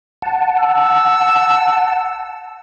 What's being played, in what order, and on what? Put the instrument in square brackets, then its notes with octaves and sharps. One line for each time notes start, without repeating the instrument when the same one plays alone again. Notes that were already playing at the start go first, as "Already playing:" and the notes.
[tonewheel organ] F#5 A5
[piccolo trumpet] E6